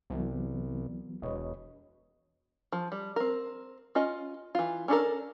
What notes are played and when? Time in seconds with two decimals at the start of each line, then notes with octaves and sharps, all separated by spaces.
0.10 C2 E3 F#3 B3
1.22 E1 B4 C#5 D#5
2.72 F3
2.92 G3
3.16 C4 A#4
3.95 C#4 F4 D#5
4.55 E3 F4
4.88 C#4 D4 A4 A#4